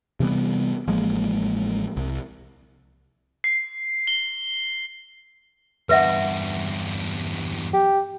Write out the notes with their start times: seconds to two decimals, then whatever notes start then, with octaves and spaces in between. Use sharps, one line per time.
0.20 C3 E3 G3 B3
0.88 A1 F3 G#3 A#3
1.97 C2
3.44 C7
4.07 G7
5.89 E2 G2 B4 E5 F#5
7.73 G4